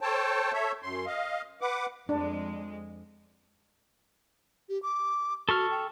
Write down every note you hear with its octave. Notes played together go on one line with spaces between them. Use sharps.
A4 C5 C#5 G5 A5
A4 C#5 E5
F#2 C6
D#5 F5
B4 F#5 D6
F2 G#3 D4
G4
D6
F#4 A4 C#6 F6
G5